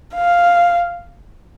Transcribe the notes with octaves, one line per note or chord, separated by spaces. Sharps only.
F5